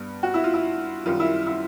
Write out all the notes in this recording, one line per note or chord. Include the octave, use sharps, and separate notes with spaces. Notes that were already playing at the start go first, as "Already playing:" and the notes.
Already playing: G2 G3 B3
F#4
E4
F4
E4
F#2 D#3 G3 F4
E4
E4